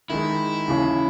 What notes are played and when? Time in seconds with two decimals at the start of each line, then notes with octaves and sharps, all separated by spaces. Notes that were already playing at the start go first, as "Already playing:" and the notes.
0.10 D#3 G#3 D#4 E4
0.68 D#2 C#3 E3